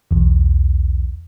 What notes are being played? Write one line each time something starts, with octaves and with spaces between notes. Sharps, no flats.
B1 E2